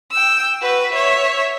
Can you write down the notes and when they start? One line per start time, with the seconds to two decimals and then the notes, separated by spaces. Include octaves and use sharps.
0.11 G5 E6
0.61 F#4 B4
0.92 C#5 E5